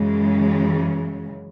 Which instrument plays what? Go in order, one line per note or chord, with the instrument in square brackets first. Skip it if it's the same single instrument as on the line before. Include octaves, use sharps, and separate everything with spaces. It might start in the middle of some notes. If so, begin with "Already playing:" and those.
Already playing: [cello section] F#2 C#3 E3 G#3